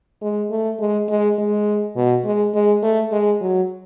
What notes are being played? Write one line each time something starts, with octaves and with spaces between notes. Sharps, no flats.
G#3
A3
G#3
G#3
G#3
B2
G#3
G#3
A3
G#3
F#3